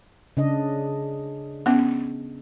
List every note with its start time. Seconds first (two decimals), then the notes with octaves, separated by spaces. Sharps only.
0.37 C#3 D4 D#5
1.66 B3 C#4